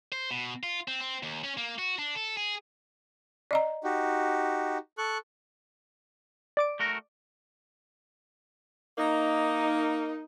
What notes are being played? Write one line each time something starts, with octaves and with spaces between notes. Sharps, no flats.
C5
B2
F4
C4
C4
D#2
C#4
A#3
F#4
D4
A4
G#4
D5 D#5 A#5
D#4 F#4 G4
A4 C#6 F#6
D5 D6 D7
A3 F#4 A#4
A#3 D#4